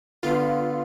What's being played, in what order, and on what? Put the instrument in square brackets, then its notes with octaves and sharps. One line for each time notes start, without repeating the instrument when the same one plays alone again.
[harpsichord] D3 B3 [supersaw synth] F4